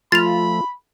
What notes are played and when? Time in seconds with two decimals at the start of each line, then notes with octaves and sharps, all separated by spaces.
0.12 F3 A3 F4 B5 A6 F7